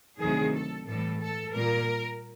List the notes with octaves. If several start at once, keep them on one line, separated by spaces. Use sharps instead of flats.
D2 C3 D#3 F#3 G#4
A4
A2 E3 G3 A4
A4
A#2 G3 A#4